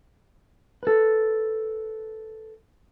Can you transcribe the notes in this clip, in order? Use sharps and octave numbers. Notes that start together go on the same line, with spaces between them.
A4 B4